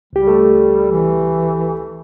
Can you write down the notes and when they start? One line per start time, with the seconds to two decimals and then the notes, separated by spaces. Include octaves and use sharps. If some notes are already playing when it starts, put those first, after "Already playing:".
0.13 C#2 G3 G4
0.27 A3
0.91 E3